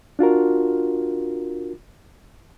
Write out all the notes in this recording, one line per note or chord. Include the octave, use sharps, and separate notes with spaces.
D4 F4 F#4 A#4